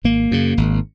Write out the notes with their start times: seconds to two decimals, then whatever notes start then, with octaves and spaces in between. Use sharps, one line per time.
0.04 G#1 A#3
0.31 F#2 C#3
0.57 G#1